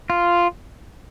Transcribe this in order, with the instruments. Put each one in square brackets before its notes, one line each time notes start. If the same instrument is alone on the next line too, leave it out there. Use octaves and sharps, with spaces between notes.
[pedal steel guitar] F4